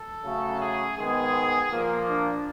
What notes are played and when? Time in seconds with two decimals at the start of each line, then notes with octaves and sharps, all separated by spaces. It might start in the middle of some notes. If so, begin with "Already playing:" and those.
Already playing: A4
0.22 C#3 F#3 A3
0.60 G#4
0.97 G#2 D#3 G#3 B3 G#4
1.71 A#2 F3 A#3
2.08 D4